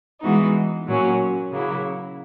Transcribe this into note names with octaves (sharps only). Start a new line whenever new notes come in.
E3 G#3 B3 D#4 F#4
A#2 F#3 C#4
C#3 F#3 A#3 E4